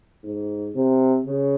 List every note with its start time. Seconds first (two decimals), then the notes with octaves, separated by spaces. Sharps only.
0.23 G#2
0.75 C3
1.26 C#3